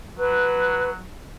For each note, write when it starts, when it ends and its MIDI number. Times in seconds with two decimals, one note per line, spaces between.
0.19 1.06 54
0.19 0.91 71